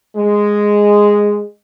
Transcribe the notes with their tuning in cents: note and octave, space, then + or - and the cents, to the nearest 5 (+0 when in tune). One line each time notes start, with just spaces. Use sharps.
G#3 -5